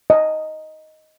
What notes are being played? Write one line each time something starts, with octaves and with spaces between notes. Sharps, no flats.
D#5